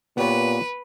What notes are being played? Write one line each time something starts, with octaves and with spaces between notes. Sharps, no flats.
A#2 B3 G4 B4 C#5